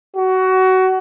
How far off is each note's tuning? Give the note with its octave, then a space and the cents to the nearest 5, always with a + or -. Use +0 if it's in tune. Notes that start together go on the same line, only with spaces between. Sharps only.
F#4 +20